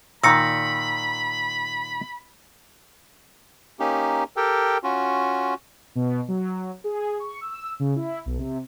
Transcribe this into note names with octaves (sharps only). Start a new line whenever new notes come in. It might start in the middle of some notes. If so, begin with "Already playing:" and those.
A#2 D#3 B5 E6 A#6 C#7
A#3 C#4 D#4 G4
G4 A4 A#4 G5
C#4 F4 F#4
B2
F#3
G#4
C#6
E6
C#3
E4
B1
C3